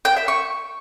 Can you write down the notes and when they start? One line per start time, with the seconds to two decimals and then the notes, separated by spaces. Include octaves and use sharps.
0.05 G5
0.17 E5
0.28 C#6